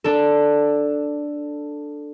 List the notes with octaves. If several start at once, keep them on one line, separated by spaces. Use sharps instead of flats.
D4 A4